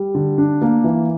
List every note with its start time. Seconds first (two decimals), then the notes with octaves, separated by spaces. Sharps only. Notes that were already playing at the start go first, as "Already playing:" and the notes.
Already playing: G3
0.15 D3
0.38 D4
0.62 A#3
0.84 E3